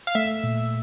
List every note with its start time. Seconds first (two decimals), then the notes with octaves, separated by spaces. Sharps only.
0.07 F5
0.15 A3 E5
0.44 A#2